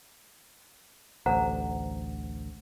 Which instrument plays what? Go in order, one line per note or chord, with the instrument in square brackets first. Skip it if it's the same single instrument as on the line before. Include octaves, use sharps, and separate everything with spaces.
[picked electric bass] A1 D2 [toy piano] C5 F#5 A#5